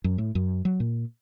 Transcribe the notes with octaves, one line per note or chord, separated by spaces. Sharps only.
F#2
A2
F#2
F#3
A#2